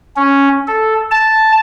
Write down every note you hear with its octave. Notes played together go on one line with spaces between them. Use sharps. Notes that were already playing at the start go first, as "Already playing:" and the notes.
C#4
A4
A5